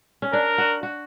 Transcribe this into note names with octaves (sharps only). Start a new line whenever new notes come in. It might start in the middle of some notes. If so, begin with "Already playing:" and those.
C#4
D4 A#4
F#4
F#4